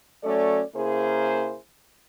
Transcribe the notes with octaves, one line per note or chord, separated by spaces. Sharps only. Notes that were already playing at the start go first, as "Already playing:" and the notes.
F#3 A3 C#4 A4 D5
C#3 A#3 E4 G#4 A#4 C5